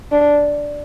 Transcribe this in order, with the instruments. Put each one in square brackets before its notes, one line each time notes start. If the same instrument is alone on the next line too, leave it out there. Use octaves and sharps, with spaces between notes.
[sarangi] D4